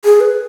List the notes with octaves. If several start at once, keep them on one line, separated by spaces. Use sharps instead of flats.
G#4
B4